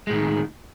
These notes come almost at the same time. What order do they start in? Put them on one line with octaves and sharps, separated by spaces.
G#3 A2 D#3